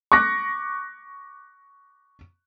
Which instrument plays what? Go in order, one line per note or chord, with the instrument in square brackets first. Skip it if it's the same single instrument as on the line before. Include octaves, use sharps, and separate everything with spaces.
[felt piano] C#6 D6 F#6 A#6